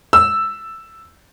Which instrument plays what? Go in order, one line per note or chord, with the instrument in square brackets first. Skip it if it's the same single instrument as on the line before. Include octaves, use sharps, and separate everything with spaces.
[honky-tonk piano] E6